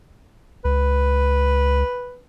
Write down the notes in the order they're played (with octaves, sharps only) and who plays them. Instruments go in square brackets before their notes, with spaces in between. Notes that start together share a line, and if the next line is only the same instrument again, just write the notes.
[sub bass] C#2 [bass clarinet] B4